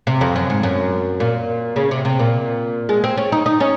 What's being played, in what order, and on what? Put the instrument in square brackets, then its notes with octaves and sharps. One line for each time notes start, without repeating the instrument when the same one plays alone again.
[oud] C3
F2
F#2
G#2
F#2
A#2
C#3
C3
C3
A#2
G#3
C4
C#4
D#4
D#4
C#4